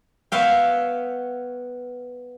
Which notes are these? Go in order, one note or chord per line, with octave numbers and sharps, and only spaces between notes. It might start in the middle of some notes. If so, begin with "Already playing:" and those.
B3 C#5 E5 F5 G5